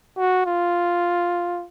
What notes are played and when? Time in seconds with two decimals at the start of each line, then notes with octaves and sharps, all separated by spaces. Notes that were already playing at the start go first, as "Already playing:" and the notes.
0.17 F#4
0.46 F4